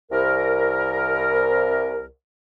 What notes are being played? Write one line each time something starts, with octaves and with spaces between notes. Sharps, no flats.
C2 A#4